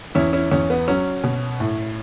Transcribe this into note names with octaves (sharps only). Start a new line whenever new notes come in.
E2 C#4 E4
C#4 E4
E2 C#4
B3
F#3 C#4
B2
A2